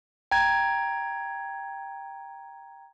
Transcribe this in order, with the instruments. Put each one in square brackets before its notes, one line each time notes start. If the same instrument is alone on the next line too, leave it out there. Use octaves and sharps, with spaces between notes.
[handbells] G5 A#5 G#6